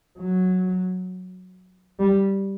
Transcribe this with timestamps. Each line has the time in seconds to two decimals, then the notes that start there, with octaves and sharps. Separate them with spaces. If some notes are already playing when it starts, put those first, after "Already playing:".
0.19 F#3
2.00 G3